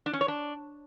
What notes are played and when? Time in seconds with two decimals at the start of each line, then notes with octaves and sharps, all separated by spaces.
0.06 D4
0.13 C#4
0.21 C#5
0.28 D4